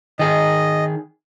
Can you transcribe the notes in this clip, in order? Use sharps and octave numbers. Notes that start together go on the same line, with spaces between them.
D#3 G#4 D#5